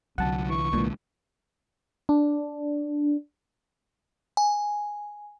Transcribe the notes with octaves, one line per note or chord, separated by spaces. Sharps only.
C2 D3 F#3 F#5 A5
E3 C#6
A#2 E3 G#3 D4
D4
G#5